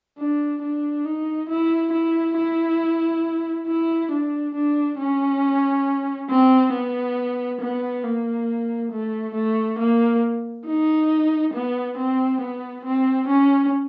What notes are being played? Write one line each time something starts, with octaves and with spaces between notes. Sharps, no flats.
D4
D4
D#4
E4
E4
E4
E4
D4
D4
C#4
C4
B3
B3
A#3
A3
A3
A#3
D#4
B3
C4
B3
C4
C#4